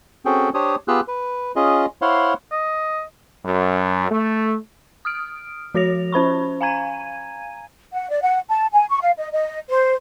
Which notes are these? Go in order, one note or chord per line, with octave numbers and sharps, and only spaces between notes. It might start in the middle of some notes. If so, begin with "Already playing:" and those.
C4 C#4 F#4 G#4 A4 G5
D4 G4 C5 C#5 D#6
B3 F4 G4 G#4 E6 F#6
B4
C#4 F4 G#4 D#5
E4 C5 C#5 F5 F#5 C6
D#5
F#2
A3
D#6 F6 D7
F3 F#4 C#5 A#6 F7
C#4 C5 B5 C#6
F5 G#5 A#5 G#6 D#7
F#5
D5
F#5
A5
G#5
C#6
F5
D#5
D#5
C5